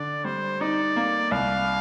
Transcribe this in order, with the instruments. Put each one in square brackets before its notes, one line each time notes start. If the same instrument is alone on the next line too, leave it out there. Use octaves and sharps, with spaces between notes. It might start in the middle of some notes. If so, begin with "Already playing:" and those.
Already playing: [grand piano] D3 [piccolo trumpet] D5
[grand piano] G3 [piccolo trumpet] C5
[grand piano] D#4 [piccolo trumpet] D5
[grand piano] A#3
[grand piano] C2 [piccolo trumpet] F5